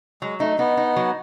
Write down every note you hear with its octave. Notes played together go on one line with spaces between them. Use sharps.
F#3 G#3
A3 D#4
B3 D#4
D#4
F#3